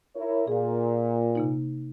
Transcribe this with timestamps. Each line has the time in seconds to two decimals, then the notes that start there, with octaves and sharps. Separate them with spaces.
0.15 E4 A#4 C#5
0.48 A#2 G#4 F5
1.35 C3 A#3 D#4